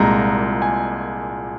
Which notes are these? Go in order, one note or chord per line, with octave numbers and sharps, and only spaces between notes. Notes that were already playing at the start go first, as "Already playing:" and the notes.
Already playing: C2 A#2 G#3 A#5
G#5